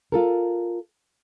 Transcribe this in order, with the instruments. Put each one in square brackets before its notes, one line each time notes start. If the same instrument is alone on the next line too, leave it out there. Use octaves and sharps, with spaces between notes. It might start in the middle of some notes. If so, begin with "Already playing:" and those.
[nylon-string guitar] F4 A4 A#4